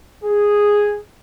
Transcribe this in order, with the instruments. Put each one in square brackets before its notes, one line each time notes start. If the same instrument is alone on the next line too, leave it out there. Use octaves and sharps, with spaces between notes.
[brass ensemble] G#4